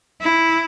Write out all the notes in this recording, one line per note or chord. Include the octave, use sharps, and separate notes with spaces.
E4